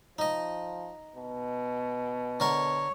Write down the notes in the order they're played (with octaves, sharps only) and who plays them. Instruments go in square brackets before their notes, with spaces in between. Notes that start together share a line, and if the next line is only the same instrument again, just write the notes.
[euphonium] F3 [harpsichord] D#4 D#5
[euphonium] B2
[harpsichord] D3 A#4 C#6 [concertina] C#5